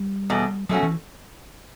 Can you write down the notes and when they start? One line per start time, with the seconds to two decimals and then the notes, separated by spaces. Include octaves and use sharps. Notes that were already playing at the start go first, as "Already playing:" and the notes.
Already playing: G3
0.30 E2 B2 F#3 A3
0.69 B2 F#3 A3 C#4 F#4
0.83 E3